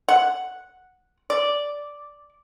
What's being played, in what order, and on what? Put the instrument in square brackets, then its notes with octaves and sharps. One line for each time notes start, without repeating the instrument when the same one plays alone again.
[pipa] F#5
D5